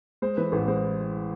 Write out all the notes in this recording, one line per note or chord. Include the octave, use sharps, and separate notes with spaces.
G#3 C5
E3 B4
A1 B4
G#3 C5